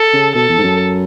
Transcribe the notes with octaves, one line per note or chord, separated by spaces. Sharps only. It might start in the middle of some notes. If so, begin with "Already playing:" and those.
Already playing: A4
C#3
B2 A4
E2
G#2
F#2